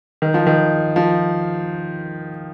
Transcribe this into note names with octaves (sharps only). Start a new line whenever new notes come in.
D#3
F3
D#3
F3